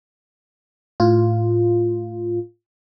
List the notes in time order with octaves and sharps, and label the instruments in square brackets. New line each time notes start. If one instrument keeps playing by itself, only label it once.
[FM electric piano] A2 F4